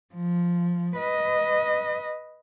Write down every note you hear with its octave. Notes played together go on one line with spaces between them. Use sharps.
F3
B4 D#5